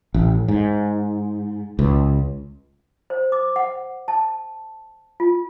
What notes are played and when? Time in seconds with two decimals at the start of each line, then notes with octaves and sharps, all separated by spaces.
0.14 A1
0.48 G#2
1.79 C#2
3.10 C5
3.32 D6
3.56 F#5
4.08 A5
5.20 F4